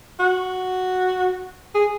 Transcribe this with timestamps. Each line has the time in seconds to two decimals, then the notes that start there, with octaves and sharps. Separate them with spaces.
0.19 F#4
1.75 G#4